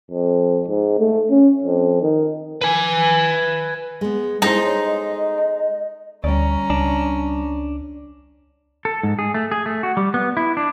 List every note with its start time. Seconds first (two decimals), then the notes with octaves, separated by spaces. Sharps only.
0.11 F2
0.68 G#2
0.99 A3
1.30 C#4
1.64 F2
2.02 D#3
2.61 B4 G#5
4.01 G#3 B3
4.42 G#3 D#4 E4 A4 C5
4.64 C#5
4.86 D#5
6.24 D2 G3 C#4 D5 A#5
6.70 C#2 D4
8.85 A4
9.03 G#2
9.19 G#4
9.34 A3
9.52 G#4
9.66 A3
9.83 F#4
9.97 G3
10.14 B3
10.37 E4
10.57 D4